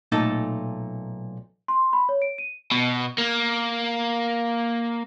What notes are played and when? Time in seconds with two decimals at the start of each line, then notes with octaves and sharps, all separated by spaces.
0.12 B1 A#2 A3 D#4 A4
1.68 C6
1.93 B5
2.09 C#5
2.22 D7
2.38 D#7
2.72 B2
3.18 A#3